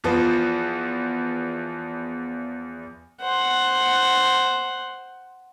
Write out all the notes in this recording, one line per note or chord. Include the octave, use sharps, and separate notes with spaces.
E2 F3 B3
C5 F#5